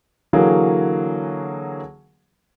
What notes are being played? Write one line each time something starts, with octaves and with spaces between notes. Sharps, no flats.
D3 E3 F#3 A#3 F#4 G#4